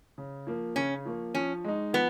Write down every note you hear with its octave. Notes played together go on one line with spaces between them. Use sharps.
C#3
F3 A#3
C#3 C#4
F3 A#3
F3 C#4
G#3 D#4
F3 B3